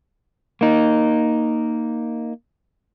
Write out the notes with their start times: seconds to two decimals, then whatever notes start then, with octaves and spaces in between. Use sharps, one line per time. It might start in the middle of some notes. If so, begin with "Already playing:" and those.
0.61 A#3 D#4